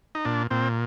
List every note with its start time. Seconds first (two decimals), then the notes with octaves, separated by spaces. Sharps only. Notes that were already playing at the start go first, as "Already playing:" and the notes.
0.15 D#4
0.25 A#2 D4
0.51 A#2 C4